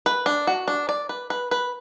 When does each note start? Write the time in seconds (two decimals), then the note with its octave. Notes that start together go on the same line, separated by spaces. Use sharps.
0.06 B4
0.26 D4
0.47 F#4
0.68 D4
0.89 D5
1.09 B4
1.30 B4
1.51 B4